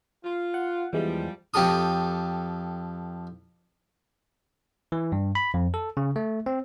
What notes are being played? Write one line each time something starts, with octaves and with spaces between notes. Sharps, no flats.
F4
F#5
E2 E3 F3 G3 G#3
F2 G4 A4 D#6
E3
G2
B5
F2
A4
C#3
A3
C4